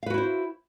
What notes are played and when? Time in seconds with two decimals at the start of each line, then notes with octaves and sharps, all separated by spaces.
0.03 F5
0.06 B4
0.10 F#4
0.14 E4
0.18 C5